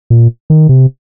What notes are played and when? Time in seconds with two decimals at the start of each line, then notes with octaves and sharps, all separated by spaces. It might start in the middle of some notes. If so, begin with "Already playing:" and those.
0.10 A#2
0.50 D#3
0.69 C3